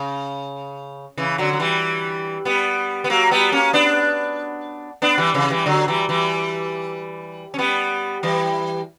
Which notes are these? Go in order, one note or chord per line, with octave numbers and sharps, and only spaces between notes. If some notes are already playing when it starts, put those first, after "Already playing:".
Already playing: C#3
C#3 E3
D3 F#3
F#3
E3 G3
G3 B3
B3
F#3 A#3
G3 B3
A#3 C#4
B3 D4
B3 D4
E3 G3
C#3 E3
E3 G3
D3 F#3
E3 G3
E3 G3
C#4
G3 B3
E3 G3